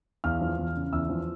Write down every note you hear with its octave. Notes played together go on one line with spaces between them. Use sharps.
E2 F5 F6
F3
E2
C#3
E2 E5 E6
F3